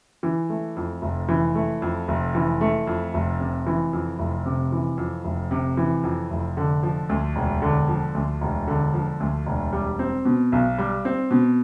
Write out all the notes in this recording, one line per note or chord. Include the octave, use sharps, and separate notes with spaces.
E3
A3
F2
F1
E3
A3
F2
F1
E3
A3
F2
F1
C3
E3
F2
F1
C3
E3
F2
F1
C3
E3
F2
F1
D3
F3
D2
E1
D3
F3
D2
E1
D3
F3
D2
E1
G3
C4
B2
B1
G3
C4
B2